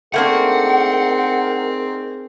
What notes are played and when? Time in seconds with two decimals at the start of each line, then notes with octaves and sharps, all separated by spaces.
0.14 A3 A#3 C4 D4 D#4 G#4 A#4 F#5